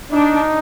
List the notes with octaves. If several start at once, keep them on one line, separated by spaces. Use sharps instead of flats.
D4 D#4